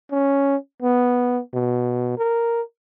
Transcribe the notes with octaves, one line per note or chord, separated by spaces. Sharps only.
C#4
B3
B2
A#4